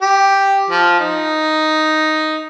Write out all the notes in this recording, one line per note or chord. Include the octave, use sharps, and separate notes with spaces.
G4
F3
D#4